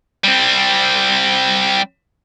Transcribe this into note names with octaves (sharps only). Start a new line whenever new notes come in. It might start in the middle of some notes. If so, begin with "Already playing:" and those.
G3 C4